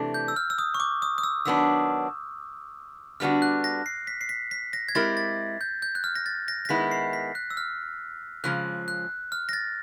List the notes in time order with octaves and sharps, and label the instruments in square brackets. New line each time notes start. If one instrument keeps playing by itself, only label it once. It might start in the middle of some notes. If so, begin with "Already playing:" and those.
Already playing: [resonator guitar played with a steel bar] C3 E3 A3 D4
[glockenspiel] G6
E6
F6
E6
D#6
C#6
D6
D#6
D#6
E6
[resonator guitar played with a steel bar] D#3 F#3 B3 D4 [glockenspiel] E6
[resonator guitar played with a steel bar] D3 G3 B3 D4 F#4 [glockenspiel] F6
[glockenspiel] F#6
A#6
C7
B6
C7
B6
B6
A#6
G#6
[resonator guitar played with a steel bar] G#3 C4 E4 G4 A#4 [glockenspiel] A6
[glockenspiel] A6
G6
G6
F#6
F6
A#6
A6
A#6
A#6
[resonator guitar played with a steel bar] D#3 G#3 B3 E4 [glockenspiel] B6
[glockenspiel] C7
B6
F#6
E6
F6
[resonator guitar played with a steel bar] C#3 F3 G#3 [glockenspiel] F#6
[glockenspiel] F#6
F6
A#6
A6